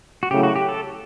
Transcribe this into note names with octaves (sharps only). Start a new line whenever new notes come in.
F#4
C#3 F#3 A3 E4 G4
F#4
G4
A4